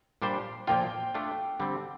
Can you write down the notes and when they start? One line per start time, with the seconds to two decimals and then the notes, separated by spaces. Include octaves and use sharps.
0.22 A#2 G3 D4 G4 C5
0.67 A#2 F3 A#3 F4 G5
1.14 A3 D4 F4
1.60 D3 G3 C4